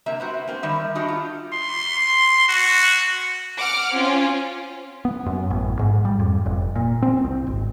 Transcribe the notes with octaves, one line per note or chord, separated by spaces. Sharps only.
C3 A#3 E5
B3 C4 F#4
A#3 C4
D#3 G3 E5
D4 D#4 F#4 G4
F4
C6
F#4
F#5 D6 F6
C4 C#4 F4
B3
F#2
A1
G#2
G3
F2
F1
A#2
C4
C2
G#1